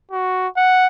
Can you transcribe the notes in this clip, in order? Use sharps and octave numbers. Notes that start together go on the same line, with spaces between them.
F#4
F#5